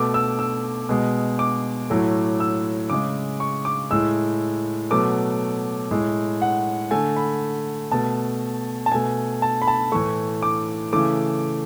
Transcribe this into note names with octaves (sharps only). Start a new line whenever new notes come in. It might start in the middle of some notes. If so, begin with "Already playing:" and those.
Already playing: B2 A3 D6
E6
E6
B2 G#3
D6
A2 F#3 A3
E6
C#3 G#3 D6
C#6
D6
A2 G#3 E6
B2 F#3 A3 D6
A2 G#3
F#5
D3 A3 G#5
B5
B2 A3 A5
A5
B2 A3 G#5
A5
B5
A5
A2 E3 A3 C#6
D6
C#3 E3 A3 D6